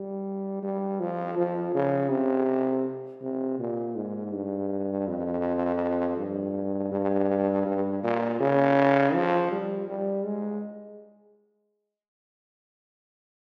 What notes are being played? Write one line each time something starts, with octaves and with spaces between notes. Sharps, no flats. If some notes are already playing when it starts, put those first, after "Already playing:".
Already playing: G3
G3
F3
F3
C#3
C3
C3
A#2
G#2
G2
F2
G2
G2
G2
A#2
C#3
F3
G3
G3
G#3